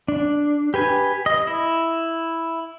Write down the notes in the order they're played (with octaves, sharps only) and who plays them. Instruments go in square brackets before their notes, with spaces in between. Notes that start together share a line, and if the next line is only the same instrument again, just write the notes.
[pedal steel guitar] D4
G4 B4 G#5
D#5
E4